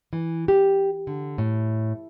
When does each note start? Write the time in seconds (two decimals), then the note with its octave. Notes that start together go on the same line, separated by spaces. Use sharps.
0.13 E3
0.48 G4
1.07 D3
1.38 A2